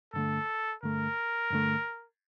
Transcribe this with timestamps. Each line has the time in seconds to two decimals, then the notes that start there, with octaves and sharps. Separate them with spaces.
0.13 G2 D3 A3 A4
0.83 G2 D3 A3 A#4
1.51 G2 D3 A3